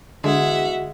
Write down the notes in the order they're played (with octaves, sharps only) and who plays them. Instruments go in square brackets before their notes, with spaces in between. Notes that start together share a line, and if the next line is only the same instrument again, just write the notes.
[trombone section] E2 F#4 [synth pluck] D3 [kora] G#3 G#4 [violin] E5 F#5